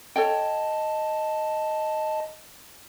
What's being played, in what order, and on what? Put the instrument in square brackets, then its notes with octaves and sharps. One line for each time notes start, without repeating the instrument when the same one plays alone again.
[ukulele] A4 C#5 G5 [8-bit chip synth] D#5 A5